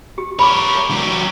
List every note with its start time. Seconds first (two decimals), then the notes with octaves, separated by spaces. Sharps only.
0.18 G4
0.39 A#4 C#5 B5 D6
0.91 F#3 G4